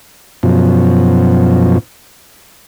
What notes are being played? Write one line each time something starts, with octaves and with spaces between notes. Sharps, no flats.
F#2 B2 F3